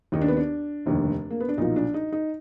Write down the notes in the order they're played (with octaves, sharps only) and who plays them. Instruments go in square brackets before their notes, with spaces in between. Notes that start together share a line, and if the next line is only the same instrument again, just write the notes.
[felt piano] D#2 D#3 D#4
D4
B3
D4
F1 D#2 D3
A#3
B3
D4
B1 A#2 F3 D#4
D4
D#4
D#4